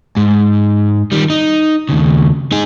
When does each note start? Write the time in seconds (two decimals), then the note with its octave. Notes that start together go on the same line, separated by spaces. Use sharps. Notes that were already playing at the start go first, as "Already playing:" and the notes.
0.17 G#2
1.12 D#3 G3
1.30 D#4
1.89 D#2 C#3
2.52 D#4 G#4